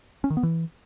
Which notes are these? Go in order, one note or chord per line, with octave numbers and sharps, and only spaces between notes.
C#4
D#3
B3
E3